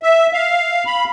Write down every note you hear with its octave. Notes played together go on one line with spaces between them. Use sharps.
E5
F5
B5